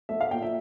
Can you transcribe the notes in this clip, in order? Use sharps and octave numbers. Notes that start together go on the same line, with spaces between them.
A3 E5
F5
A#2 G5
E5